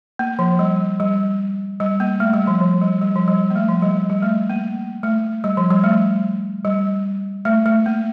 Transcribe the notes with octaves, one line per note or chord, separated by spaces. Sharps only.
A#3
F3
G3
G3
G3
A#3
A3
G3
F3
F3
G3
G3
F3
G3
A#3
A3
F3
G3
G3
A3
A#3
A3
G3
F3
G3
A3
G3
A3
A3
A#3